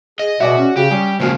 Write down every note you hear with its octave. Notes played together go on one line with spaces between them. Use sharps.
G#4 D#5
B2 F#4 G#4 D5 E5
C#4
C#3 F#4 G4
G3 C#4 G#4
C#2 F3 A#3 C#4 F#4 G#4